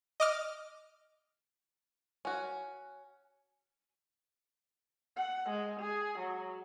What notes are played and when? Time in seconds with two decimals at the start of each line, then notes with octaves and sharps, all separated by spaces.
0.20 D#5 D6 F6
2.25 C#4 F#4
5.16 F#5
5.49 G#3
5.80 G#4
6.19 F#3